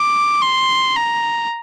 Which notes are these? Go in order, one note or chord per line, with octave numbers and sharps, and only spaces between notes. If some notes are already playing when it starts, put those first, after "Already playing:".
Already playing: D6
C6
A#5